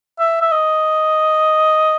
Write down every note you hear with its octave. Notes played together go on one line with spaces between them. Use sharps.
E5
E5
D#5